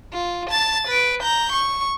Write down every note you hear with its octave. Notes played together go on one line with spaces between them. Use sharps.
F4
A5 A6
B4 D7
A#5 G6
C#6